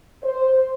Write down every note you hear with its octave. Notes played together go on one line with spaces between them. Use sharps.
C5